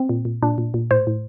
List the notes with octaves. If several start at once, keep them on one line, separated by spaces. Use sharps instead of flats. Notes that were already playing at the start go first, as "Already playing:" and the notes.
Already playing: C4
A#2
A#2
A#2 D4
A#2
A#2
A2 C5
A2